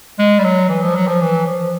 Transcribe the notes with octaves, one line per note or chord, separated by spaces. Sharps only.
G#3
G3
F#3
E3
F3
F#3
F3
E3
F3